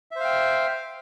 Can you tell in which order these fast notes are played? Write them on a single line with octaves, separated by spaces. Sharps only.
E5 C5 F5 G5